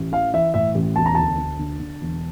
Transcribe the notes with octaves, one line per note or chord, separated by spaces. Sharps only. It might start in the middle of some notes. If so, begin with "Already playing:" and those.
Already playing: A1
E3 F5
E3 E5
A2 E5
A1
E1 A5
A#5
D2 A5
D2
D3
D3
E1